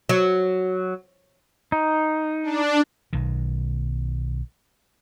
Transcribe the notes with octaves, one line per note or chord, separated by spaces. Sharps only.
F#3
D#4
D4
B1 D#3